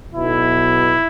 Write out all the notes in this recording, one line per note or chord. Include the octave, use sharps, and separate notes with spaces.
B1 B2 E4